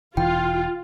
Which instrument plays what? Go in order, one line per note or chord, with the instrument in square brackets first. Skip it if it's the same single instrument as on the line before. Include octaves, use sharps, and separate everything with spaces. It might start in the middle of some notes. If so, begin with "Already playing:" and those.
[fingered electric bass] E1 E3 [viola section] F4 [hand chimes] G5